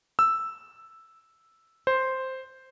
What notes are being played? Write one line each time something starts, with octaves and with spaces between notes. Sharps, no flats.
E6
C5